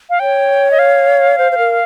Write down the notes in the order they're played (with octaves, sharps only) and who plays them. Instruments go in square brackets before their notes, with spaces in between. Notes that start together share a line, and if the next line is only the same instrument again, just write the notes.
[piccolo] F5
[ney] C#5 [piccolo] G5
[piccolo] D#5
F5
[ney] C5
C5
A#4